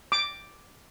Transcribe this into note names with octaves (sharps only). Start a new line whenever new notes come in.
D6